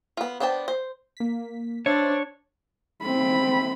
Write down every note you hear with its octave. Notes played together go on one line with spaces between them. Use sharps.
B3 F4
B3 D4 C5 G5 A5
C5
A#3 B6
D4 C5 C#5 E5 A6
C4 B5